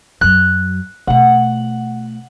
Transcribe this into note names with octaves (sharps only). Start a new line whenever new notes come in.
F#2 F#3 F#6
B2 A3 F#5